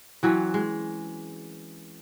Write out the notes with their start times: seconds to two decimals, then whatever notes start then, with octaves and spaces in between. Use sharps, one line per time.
0.23 E3 F#3 C4 C#4
0.54 G#3